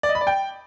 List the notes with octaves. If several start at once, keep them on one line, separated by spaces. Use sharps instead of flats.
D5
D#5
B5
D5
G5